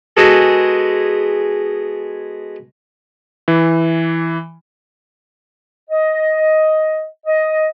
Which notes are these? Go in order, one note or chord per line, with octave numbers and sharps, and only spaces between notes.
G#3 B3 F#4 G#4 A4
E3
D#5
D#5